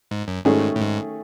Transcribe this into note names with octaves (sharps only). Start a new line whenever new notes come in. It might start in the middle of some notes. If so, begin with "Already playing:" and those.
G#2
F#2
G#2 D#3 A3 C#4 G#4
A2
G#2